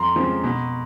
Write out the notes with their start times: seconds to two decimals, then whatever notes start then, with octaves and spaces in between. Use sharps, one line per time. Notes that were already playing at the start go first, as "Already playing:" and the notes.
Already playing: F2 A#5 C6
0.16 C#3 F3 G#3 C4
0.44 B2